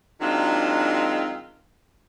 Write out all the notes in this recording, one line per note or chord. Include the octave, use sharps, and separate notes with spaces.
D#3 F#3 G#3 C4 D4 F4